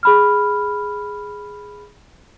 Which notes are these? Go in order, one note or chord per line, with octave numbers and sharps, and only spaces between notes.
G#4 B5 F6